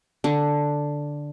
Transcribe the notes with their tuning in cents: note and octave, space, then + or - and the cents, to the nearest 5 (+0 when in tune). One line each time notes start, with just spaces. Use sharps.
D3 +0 D4 +0